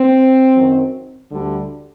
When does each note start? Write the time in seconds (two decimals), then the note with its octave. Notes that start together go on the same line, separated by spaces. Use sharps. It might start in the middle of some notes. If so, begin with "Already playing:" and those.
Already playing: C4
0.55 F#2 D#3 F#3
1.31 D2 D3 G3